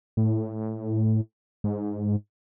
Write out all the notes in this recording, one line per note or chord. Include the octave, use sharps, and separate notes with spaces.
A2
G#2